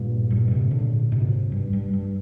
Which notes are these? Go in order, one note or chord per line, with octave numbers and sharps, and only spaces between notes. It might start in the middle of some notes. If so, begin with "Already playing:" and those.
Already playing: G2 A#2
G2 A#2
G#2 C3
A#2 D3
G#2 C3
G2
G2
G2